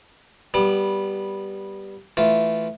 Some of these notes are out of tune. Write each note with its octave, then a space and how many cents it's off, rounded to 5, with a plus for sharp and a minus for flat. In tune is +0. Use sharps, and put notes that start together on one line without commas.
G3 +0 B3 -10 D6 +40
E3 +0 A3 +0 F4 +0